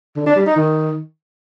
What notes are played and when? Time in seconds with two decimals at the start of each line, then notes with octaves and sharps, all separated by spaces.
0.16 D3
0.26 D4
0.36 G3
0.46 D#4
0.56 D#3